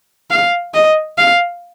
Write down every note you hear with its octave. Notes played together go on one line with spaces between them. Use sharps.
F5
D#5
F5